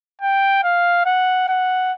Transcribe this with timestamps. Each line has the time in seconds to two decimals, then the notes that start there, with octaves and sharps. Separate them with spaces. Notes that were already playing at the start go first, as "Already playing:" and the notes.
0.22 G5
0.64 F5
1.06 F#5
1.48 F#5